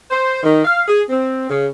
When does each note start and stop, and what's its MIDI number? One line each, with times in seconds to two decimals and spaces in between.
0.10 0.40 72
0.43 0.62 51
0.64 0.82 77
0.88 1.02 68
1.09 1.47 60
1.50 1.67 49